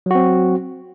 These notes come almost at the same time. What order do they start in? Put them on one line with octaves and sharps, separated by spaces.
F#3 F#4 C4